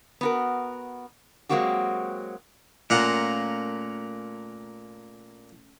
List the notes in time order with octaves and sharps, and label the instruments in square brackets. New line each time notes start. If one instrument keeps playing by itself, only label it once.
[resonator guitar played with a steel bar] B3 F#4 A#4
F#3 G#3 A#3 C4 F#4 G4
[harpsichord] A#2 F4 F#5 [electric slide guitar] A3 C#4 A#4